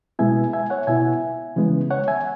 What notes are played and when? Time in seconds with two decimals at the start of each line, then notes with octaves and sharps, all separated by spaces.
0.19 B2 G#3 B3 E4 E5 G#5
0.53 E5 G#5
0.70 C#5 F#5
0.87 B2 B3 E4 E5 G#5
1.56 C#3 E3 G#3 B3
1.91 C#5 F#5
2.08 E5 G#5